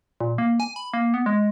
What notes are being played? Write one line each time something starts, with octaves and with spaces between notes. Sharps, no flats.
A#2
A#3
G#5
B5
A#3
B3
G#3